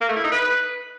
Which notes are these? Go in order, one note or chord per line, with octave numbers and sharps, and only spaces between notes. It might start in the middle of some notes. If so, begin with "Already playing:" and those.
A#3
A3
E4
D#4
B4